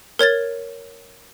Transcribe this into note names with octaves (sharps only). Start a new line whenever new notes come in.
A#4 C#5 G#6 A6